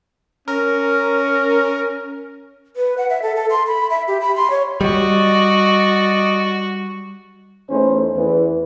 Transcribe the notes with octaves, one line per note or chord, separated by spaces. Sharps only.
C#4 A#4
B4
F#5
E5
A4
A4
C6
B5
E5
G4
B5
C6
C#5
G3 F#4 D5 D#5
E2 A3 C#4 D#4 B4 C5
E2 E3 B4